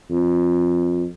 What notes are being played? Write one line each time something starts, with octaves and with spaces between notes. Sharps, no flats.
F2